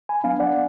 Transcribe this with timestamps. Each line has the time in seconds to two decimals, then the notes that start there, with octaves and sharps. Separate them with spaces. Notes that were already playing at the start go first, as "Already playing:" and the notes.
0.09 G#5 B5
0.24 F#3 B3 D4 F5 G#5
0.40 D5 F#5